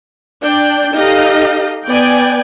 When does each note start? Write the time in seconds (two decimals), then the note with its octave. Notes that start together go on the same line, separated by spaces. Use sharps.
0.43 D4 D5 G5
0.96 D#4 G4 A4 D#5 F5
1.87 B3 D5 G5 G#5